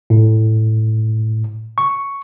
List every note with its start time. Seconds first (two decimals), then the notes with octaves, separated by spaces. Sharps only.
0.10 A2
1.78 C#6